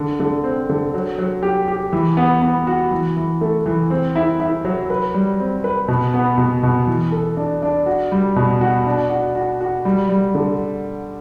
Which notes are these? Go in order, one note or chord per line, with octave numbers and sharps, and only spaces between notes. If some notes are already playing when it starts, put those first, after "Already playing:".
Already playing: D3
D3
C4
D3
F#3
F#3
G4
G4
E3
B3
B3
F#4
E3
E3
A3
E3
C4
E4
E4
F#3
B4
G3
C4
B4
B2
B3
B2
B2
E3
A4
D4
D4
F#4
G3
B2
F#4
D4
F#4
F#4
F#4
G3
G3
D3